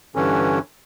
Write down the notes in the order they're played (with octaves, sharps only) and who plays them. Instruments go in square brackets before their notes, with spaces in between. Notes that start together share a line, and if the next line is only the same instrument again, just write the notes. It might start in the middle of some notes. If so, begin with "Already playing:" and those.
[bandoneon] G2 D3 E3 C#4